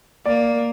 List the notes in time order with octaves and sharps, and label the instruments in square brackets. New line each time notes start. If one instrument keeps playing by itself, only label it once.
[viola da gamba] A#3 [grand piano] D5